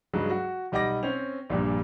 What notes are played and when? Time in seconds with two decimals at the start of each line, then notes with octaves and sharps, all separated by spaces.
0.13 G2 C#3 F#3 G#3
0.30 F#4
0.72 B1 G3 D#5 F#5 D6 A#6
1.03 C4 C#4 C5 F7
1.50 A#1 G2 A#2 G3